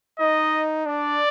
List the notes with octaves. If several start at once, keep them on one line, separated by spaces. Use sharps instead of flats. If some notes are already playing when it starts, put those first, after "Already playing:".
D#4 D#5
D4 D5